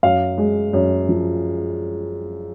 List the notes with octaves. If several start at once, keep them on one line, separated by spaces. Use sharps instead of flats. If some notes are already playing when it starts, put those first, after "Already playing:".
F#2 F5
G#3
F#2
F3